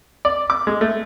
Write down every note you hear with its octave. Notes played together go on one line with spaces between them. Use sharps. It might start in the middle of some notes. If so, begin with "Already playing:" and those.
D5
D6
G#3
A3